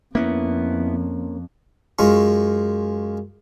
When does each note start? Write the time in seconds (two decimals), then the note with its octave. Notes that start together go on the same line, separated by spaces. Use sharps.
0.15 F2 A#3 B3 C#4 E4
1.99 F#2 G#3 F4 C#6